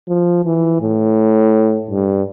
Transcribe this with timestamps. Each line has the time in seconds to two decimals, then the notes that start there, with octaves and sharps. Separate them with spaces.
0.08 F3
0.45 E3
0.81 A2
1.91 G2